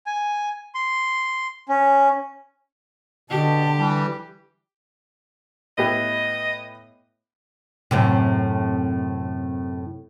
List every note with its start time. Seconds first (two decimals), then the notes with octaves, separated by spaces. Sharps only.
0.06 G#5
0.75 C6
1.69 C#4
3.30 B2 D3 G4 A5
3.78 E3 G3
5.78 A2 B3 G4 D#5
7.91 F#2 A2 C3